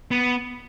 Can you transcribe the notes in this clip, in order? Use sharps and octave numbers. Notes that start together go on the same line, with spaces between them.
B3